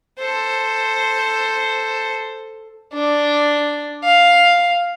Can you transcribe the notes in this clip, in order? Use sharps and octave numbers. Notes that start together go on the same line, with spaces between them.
A4 C5
D4
F5